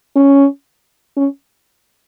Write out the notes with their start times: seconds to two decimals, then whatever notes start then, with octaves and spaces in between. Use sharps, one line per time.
0.16 C#4
1.16 C#4